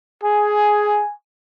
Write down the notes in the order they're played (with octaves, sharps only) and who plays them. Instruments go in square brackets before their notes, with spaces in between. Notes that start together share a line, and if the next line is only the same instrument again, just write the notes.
[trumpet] G#4 [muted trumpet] G#5